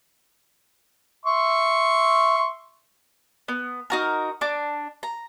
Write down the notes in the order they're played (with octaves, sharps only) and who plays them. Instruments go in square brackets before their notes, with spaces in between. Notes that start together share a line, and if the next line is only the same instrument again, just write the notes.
[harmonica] E5 C6 C#6
[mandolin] B3
D#4 F#4 A#4
D4 D6
A#5